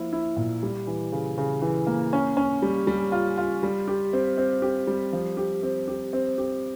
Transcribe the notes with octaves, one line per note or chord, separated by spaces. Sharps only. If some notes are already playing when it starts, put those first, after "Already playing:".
Already playing: F3 A#3 E4
E4
A#2
G3
E3
C#3
C#3
E3
A#3
C#4
C#4
G3
G3
F4
F4
G3
G4
C4
C4
G4
G3
F3
G4
C4
G4
C4
G4